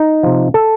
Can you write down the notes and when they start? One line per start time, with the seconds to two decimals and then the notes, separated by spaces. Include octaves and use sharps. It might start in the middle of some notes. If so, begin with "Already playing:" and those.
Already playing: D#4
0.23 C3 F3
0.54 A4